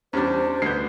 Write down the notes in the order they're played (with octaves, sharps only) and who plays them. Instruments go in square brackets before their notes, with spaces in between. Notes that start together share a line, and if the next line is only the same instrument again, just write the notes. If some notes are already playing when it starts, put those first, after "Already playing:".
[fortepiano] E2 G3 D4 [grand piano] C#4 [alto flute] C5
[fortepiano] D2 B3 [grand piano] G6 C7